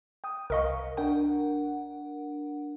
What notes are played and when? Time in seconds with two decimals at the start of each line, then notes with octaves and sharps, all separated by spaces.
0.24 G5 D#6
0.50 C2 A#4 D#5 F5 C#6
0.97 D4 A#4 F#5 G5